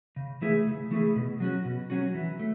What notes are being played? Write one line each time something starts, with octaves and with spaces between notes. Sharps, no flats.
C#3
E3 A3 E4 G#4
C#3
E3 A3 E4 G#4
B2
F#3 C#4 F#4
B2
F#3 C#4 F#4
E3
A3